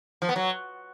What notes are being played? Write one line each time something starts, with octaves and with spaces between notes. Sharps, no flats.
F3
B3
F#3